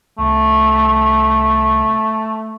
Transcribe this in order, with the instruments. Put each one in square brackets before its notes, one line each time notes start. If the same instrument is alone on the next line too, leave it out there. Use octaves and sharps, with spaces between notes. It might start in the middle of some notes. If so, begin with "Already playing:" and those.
[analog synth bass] C2 [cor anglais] A3